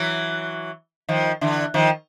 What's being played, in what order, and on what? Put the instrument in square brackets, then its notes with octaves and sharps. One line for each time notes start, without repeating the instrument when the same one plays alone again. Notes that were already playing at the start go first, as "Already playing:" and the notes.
Already playing: [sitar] E3 F#3
D#3 F3
D3 E3
D#3 F3